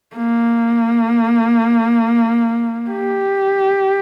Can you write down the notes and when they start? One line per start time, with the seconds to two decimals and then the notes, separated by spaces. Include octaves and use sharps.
0.16 A#3
2.90 G4